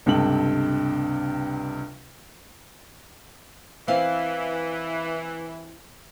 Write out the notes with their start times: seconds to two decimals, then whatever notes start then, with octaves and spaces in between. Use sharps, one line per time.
0.06 C#2 G2 C3 A4 G5 F#7
3.88 E3 C4 E4 F5